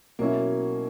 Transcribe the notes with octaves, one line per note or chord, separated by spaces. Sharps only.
B2 F#3 A#3 C#4 E4